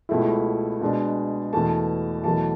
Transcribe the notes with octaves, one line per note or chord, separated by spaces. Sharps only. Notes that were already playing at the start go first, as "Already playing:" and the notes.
C#2 B2 A3 E4
B2 G#3 D4
E2 B2 A3 A5
E2 B2 F#3 A3 A5